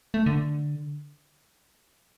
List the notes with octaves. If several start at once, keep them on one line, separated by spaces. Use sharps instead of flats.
A3
D3